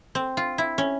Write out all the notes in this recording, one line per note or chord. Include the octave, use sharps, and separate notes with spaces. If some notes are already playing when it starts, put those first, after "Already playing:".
C4
F4
E4
C#4